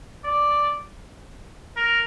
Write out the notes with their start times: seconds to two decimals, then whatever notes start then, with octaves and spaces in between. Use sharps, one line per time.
0.24 D5
1.76 A#4